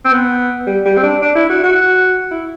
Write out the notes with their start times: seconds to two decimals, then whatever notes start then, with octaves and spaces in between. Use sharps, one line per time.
0.05 C4
0.12 B3
0.66 G3
0.85 G3
0.97 C4
1.03 D4
1.22 D4
1.35 E4
1.49 F#4
1.63 F#4
2.31 E4